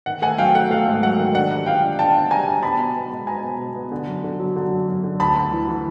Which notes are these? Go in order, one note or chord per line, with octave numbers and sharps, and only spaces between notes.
D#3 F#5
A3 F#5 G#5
F#3 F5 G5
A3 F#5
A3 F5
G#2
F#3 F#5
D#3
D4 F#5
G3
A#2 F5 G5
D4
D4 G5 A5
D4
G3 G#5 A#5
D4
B3 A5 B5
B2
B3
G#3
B2 G#5 A#5
B3
B2
B3
D3
F#2
D3
F#3
D3
F#2
F#2
D3
D2 A5 B5
D2
E3
E3